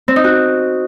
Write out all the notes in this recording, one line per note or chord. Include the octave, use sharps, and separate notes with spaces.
C4
D#4
F#4